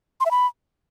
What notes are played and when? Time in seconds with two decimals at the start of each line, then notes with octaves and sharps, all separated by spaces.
0.20 C6
0.26 E5
0.31 B5